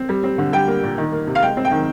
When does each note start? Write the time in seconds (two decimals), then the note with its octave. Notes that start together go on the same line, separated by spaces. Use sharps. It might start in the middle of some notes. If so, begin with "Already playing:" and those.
Already playing: C4
0.09 G3
0.24 C4
0.38 D3
0.53 G3 G5
0.68 A#3
0.83 A#2
0.98 D#3
1.12 A#3
1.27 C3
1.35 F5
1.42 G#3 G5
1.57 C4
1.65 G5
1.71 D#3